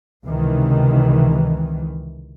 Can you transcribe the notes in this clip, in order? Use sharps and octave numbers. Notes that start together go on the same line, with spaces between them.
C#2 C3 D#3 E3